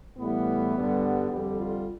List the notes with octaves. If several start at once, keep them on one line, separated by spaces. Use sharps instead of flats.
A2 E3 G3 B3
G2 D3 G3
F2 D3 G3 G4
F4